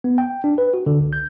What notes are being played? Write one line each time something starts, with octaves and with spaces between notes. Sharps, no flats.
B3
G5
D4
B4
F#4
D3
C#2
G6